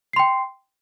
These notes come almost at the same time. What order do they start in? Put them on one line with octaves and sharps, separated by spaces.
C7 C6 G5